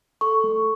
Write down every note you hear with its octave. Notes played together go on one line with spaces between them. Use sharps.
A4 C#6
A3